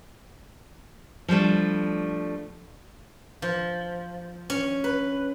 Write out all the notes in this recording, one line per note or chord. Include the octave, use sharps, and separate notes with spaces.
F3 G3 A3 D4
F3
C#4
B4